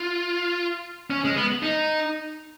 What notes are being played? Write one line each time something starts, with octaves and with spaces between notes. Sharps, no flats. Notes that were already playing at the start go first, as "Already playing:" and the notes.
Already playing: F4
C#4
G#3
B3
D#4